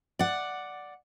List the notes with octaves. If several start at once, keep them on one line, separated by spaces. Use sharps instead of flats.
D5 F#5